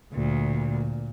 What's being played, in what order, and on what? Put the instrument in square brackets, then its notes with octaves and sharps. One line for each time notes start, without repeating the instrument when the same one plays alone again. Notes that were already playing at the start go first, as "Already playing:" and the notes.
[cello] D2 [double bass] A#2